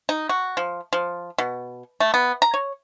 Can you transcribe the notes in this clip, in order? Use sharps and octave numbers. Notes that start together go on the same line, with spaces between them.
D#4
F#4
F3
F3
B2
A3
B3
A#5
C#5